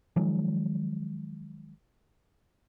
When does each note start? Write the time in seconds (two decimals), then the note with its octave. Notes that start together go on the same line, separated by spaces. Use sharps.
0.16 D#3 F3 F#3 G#3